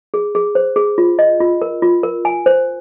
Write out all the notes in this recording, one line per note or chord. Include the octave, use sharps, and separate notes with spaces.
G#4
G#4
C5
G#4
F4
D#5
F4
A#4
F4
A#4
G#5
C5